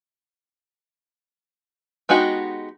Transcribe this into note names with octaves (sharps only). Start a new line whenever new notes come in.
G#3 B3 D#4 F#4 G4